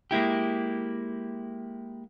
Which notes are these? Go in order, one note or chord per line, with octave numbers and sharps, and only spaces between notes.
G#3 A#3 E4 G4